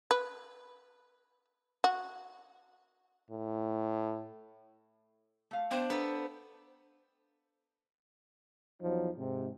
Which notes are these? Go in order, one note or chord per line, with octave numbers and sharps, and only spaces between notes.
B4
F#4
A2
A3 F5
B3 D4 C5 G5 C6
B3 D4 A4
E2 F3 F#3 D#4
G#2 C3